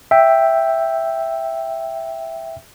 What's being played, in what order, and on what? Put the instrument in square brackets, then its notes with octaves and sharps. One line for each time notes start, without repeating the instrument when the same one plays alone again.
[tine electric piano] E5 G5